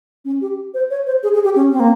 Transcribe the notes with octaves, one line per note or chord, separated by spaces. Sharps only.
C#4
G4
C5
C#5
C5
G#4
G#4
G4
C#4
C4
A#3